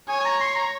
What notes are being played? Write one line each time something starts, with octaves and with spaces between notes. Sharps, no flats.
C#5 G#5
G#5
A#5
C6
A#5